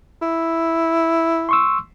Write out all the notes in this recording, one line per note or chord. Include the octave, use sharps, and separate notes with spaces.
E4
C6 C#6 E6